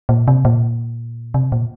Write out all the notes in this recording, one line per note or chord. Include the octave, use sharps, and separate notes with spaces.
A#2
C3
A#2
C3
A#2